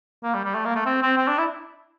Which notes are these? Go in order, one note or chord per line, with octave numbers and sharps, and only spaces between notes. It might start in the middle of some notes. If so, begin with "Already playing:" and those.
A#3
G3
G3
A3
A#3
A3
C4
C4
C4
D4
E4